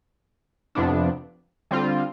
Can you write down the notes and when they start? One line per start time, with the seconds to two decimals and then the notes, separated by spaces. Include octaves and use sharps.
0.75 F2 C3 F3 B3 D4
1.71 D3 G3 C4 F4